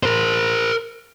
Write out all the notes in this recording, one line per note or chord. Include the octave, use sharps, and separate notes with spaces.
A#4 C5